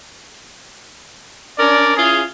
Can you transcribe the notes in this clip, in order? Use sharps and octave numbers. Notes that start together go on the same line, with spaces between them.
C#4 D4 A#4 D5
C#4 E4 F4 G#4